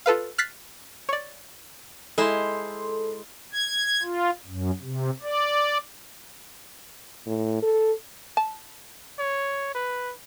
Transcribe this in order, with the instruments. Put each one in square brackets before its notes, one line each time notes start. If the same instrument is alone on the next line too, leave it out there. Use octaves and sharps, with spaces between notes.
[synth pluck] F4 A4 B4 F5
F6 F#6 A6 B6 C7
C#5 D5
[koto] G#3 E4 C5 [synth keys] A4 C6
[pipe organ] G#6
F4
F#2
C3
D5
[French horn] A2
A4
[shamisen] A5
[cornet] C#5
B4